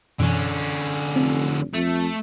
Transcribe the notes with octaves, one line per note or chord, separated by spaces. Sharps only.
F#2 B2 D3 E3 C#4
F1 C4
F2 A3